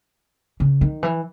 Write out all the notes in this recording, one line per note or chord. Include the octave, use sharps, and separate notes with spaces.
C#3
D#3
E3